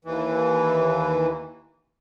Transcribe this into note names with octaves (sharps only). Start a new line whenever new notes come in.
D#2 E3